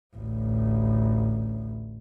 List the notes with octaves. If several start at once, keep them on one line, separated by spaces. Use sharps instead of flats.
A1 D2